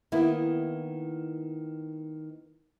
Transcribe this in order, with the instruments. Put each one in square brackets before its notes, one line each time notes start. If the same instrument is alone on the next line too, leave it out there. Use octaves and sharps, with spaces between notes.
[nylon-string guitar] D#3 A#3 B3 E4